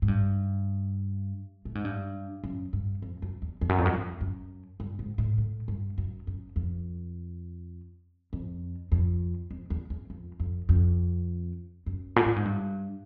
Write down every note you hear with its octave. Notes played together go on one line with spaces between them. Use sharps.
G#2
G2
A2
G#2
G2
F#2
G2
F2
F#2
E2
F2
F#2
F2
F#2
F2
F#2
G2
G#2
A2
A2
G2
F#2
F#2
F2
F2
F2
F2
E2
E2
F2
F2
F2
F#2
A#2
A2
G#2
G2